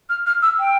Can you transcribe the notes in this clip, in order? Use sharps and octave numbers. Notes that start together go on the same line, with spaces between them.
F6
F6
E6
G5